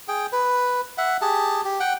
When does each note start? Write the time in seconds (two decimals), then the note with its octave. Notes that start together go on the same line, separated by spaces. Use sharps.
0.08 G#4 G5
0.32 B4
0.98 E5 F#5
1.22 G4 G#4 A5
1.65 G4
1.80 F#5 G5